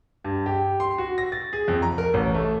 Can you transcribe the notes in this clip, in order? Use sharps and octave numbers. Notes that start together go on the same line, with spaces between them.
G2
G4
C6
F#4
A#6
A6
G#4
F2
A#5
A#4
A1
A3